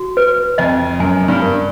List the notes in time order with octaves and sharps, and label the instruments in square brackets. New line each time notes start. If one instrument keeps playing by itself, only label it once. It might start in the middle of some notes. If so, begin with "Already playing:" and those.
Already playing: [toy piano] F#4
B4
[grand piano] F2 [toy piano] D#5
[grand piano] F#2 [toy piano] G#5
[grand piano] G2
[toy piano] A#4